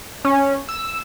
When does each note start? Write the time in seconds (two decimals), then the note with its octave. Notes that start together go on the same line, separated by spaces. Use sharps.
0.25 C#4
0.69 E6